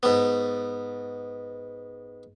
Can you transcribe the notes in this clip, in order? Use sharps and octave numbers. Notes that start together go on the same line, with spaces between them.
G#2 B3